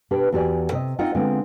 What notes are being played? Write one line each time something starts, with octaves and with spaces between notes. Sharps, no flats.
B2 D4 G4 B4
E2 F#4 G4 D5 G#5
C3 D#5
C4 D#4 F4 C5 D#5 F#5
D3 G#3 B3 C4 F4